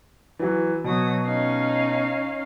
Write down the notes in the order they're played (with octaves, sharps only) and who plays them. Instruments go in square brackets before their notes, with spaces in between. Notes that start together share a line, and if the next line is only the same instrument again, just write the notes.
[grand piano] E3 F#3
[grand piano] B2 [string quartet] F#3 D#6
[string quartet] C#4 D#4 F5